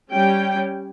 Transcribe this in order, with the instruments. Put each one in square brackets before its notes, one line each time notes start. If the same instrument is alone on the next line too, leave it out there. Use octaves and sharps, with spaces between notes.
[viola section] G3 C#4 G5